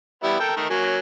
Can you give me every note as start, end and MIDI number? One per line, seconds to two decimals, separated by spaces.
0.23 0.35 55
0.23 0.35 59
0.23 0.35 64
0.40 0.56 69
0.40 0.56 70
0.40 0.56 79
0.56 0.66 51
0.56 0.66 57
0.56 0.66 70
0.70 0.99 54
0.70 0.99 58
0.70 0.99 61